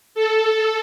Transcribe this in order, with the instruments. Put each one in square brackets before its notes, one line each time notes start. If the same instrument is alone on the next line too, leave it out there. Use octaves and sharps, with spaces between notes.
[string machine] A4